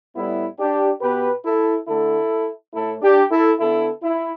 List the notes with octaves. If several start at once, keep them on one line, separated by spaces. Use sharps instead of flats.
A2 G3 B3 E4
D4 G4
B2 B3 G4 B4
E4 A4
D3 A3 E4 A4
A2 A3 E4 A4
D4 G4
E4 A4
D3 B3 E4 A4
E4